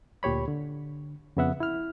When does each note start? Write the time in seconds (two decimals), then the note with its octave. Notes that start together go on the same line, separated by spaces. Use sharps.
0.23 D2 A#2 G4 C#5 B5
0.48 D3
1.37 F2 C#3 B3 E5 F#5
1.60 E4 F6